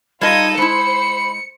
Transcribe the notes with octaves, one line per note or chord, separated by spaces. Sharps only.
G3 D#4 F4 A4 D#5 D#6 G#6
G#3 E4 C5 B5 C#7